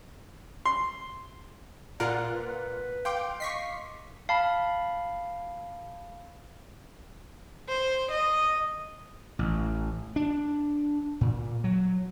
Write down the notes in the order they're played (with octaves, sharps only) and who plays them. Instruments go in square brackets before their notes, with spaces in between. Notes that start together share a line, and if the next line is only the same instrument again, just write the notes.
[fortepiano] C6
[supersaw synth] A#2 F4 F#5 [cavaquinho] A#4 [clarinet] D5
[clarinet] B4
[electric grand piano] F5 C6 D6 [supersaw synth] G5
[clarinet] D#5 [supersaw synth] C#6 B6 C7
[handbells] F5 A5 B5
[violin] C5
D#5
[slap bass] A1
D4
A#2
F#3